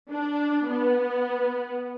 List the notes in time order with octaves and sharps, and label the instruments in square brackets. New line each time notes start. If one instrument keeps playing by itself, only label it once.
[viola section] D4
B3